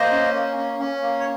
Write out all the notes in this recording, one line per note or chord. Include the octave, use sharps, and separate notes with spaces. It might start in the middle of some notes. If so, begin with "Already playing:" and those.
Already playing: A#3 C5 D#5
C#4
A#3
C#4
C#4
A#3
C#5